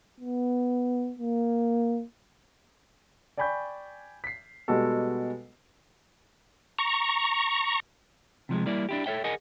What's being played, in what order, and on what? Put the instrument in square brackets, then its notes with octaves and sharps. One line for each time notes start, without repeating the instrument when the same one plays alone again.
[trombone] B3
A#3
[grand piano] D5 G5 G#5 B5 C#6 G6
B6 C7
B2 G3 G#3 B3 F#4 A4
[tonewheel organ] A#5 C#6
[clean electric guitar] C3 F3 F#3 G#3
G3 A#3 E4 D5
D4 E4 G4
A4 A#4 C#5 E5 G5
G#4 A#4 D#5 F#5 G#5